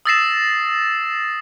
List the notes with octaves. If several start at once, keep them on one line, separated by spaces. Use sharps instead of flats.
D#6 E6 A6 A#6 C7 E7